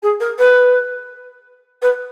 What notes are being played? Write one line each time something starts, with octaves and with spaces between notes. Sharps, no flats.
G#4
A#4
B4
B4